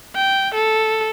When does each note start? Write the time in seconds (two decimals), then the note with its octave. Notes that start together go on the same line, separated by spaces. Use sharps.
0.16 G5
0.54 A4